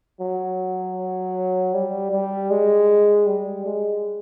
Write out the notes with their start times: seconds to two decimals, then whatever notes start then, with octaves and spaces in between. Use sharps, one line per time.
0.21 F#3
1.74 G3
2.11 G3
2.50 G#3
3.26 G3
3.66 G#3